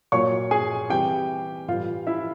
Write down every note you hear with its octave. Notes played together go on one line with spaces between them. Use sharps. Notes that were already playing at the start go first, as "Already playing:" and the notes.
A#2 F#3 C#5 C#6
G#4 G#5
C3 E3 G3 G4 G5
A2 E3 G3 F4 F5
E4 E5